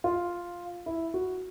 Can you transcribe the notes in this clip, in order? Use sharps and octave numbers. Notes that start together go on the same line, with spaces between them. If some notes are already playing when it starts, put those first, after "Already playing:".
F4
E4
F#4